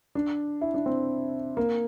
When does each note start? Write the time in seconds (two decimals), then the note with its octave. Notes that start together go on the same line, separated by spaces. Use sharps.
0.15 D4
0.61 E4
0.74 D4
0.86 C4
1.57 A#3